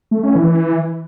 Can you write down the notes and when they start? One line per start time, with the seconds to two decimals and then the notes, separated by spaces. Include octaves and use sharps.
0.11 A3
0.23 C#4
0.35 E3